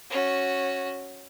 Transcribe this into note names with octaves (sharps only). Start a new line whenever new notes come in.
C#4 F#4